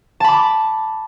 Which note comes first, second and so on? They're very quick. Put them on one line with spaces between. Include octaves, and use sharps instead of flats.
A5 B5 D6